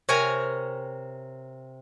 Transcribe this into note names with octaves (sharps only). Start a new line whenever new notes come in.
C3 A#4 C#5 G#5 A#5